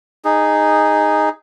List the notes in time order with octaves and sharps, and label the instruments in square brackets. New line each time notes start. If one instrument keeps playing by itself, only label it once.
[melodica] D#4 G#4